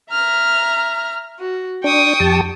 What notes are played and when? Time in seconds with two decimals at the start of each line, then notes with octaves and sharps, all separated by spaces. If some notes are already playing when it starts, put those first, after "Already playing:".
0.11 E5 A#5 F6
1.39 F#4
1.84 D4 G5 C#6 D#6
2.20 F2 G4 A5